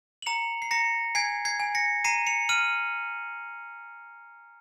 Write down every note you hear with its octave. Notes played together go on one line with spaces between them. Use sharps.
F#7
A#5 C#7 F7
C7
A#5 A#6 C#7
G#5 G#6 C7
G#6 C7
G#5
A#6 C#7
A#5 C7 D#7
C#7 F7
F6 D#7 F#7